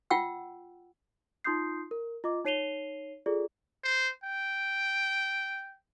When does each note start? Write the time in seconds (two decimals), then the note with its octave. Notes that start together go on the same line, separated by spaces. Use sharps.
0.10 F4 F#5 G5 E6
1.44 D#4 F4 C6 D#6 G6 C7
1.91 A#4
2.24 F4 D#5 D6
2.45 D#4 C#5 C7 D#7 F7 G7
3.26 F4 G#4 A4 D5
3.84 C5
4.24 G5